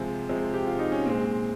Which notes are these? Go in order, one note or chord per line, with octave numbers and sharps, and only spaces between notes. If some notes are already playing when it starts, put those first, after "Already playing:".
Already playing: C3 F3 G#3 C4
C3 F3 G#3
G4
F4
D#4
C#4
A#2 G#3 C4